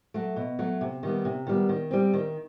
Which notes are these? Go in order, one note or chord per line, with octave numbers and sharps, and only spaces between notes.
F#3 A3
B2
F#3 A3
C3
D#3 G3 B3
C3
D#3 G3 B3
D#3
G3 C4
D#3